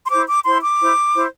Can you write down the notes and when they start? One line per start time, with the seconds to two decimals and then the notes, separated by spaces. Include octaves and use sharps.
0.06 C6
0.10 E4 C5 D6
0.27 D6
0.45 E4 C5 C6
0.62 D6
0.79 E4 C5
1.14 E4 C5